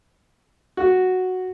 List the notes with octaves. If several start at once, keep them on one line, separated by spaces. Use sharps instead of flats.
F#4